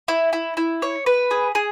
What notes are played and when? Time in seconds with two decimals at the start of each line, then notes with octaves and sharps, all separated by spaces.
0.08 E4
0.33 E4
0.57 E4
0.82 C#5
1.06 B4
1.31 G#4
1.55 G#4